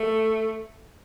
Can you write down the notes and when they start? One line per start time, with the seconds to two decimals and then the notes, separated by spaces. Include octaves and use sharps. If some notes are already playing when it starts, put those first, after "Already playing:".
Already playing: A3